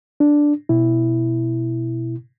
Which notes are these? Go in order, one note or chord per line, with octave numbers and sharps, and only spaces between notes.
D4
B2 E4